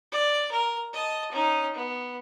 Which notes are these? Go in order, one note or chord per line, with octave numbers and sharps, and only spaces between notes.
D5
A#4
D#5 A5
C#4 D#4
B3